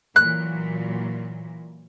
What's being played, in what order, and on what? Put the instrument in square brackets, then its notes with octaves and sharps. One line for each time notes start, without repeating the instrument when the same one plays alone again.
[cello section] A#2 E3 F#3 [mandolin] F#6